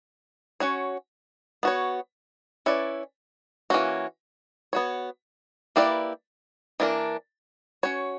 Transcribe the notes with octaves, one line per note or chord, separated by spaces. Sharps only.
C#4 F#4 C#5
B3 F#4 C#5
C#4 E4 B4 D5
E3 A#3 C#4 F#4
B3 F#4 C#5
A#3 E4 G4 B4 D5
E3 A#3 D4 A#4
C#4 F#4 C#5